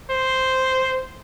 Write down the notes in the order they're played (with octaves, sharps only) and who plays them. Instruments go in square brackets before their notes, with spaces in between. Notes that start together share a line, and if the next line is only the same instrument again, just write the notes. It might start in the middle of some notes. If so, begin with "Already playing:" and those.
[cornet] C5